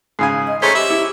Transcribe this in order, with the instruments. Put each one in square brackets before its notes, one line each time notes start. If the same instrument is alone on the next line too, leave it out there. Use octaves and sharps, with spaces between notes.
[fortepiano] G#2 C#3 G#5 [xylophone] B5 D#6 C7
[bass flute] D#5
[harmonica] A3 C#4 [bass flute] G#4 [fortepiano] C5 A#5 [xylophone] G#6 B6 G7
[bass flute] G4 [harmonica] E5 [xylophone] B5 D6
[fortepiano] E4